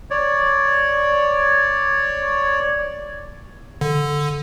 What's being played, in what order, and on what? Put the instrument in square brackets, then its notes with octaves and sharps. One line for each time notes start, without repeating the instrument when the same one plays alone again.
[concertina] C#5 D5
[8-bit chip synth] D3